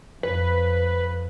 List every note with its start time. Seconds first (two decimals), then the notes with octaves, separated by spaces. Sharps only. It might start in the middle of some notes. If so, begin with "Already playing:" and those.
0.23 F2 B4